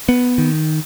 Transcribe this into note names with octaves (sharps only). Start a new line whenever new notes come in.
B3
D#3